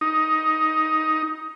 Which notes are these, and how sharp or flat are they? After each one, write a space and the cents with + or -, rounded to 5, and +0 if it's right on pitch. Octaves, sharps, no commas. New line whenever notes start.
D#4 +10